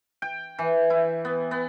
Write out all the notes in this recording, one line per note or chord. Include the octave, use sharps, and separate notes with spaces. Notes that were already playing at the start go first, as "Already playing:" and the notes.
G5
E3
E4
B3
B3